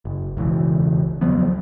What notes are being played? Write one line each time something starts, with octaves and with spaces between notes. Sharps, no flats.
F#1
E1 C#2 E3
C#2 F3 F#3 B3